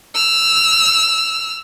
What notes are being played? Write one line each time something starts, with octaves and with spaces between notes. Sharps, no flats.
E6 F6